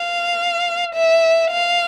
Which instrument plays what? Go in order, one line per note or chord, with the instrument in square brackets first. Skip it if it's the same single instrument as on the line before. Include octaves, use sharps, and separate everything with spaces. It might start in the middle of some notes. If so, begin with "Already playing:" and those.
Already playing: [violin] F5
E5
F5